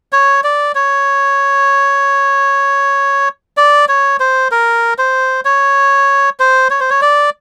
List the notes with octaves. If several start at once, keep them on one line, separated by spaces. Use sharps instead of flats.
C#5
D5
C#5
D5
C#5
C5
A#4
C5
C#5
C5
C#5
C5
C#5
D5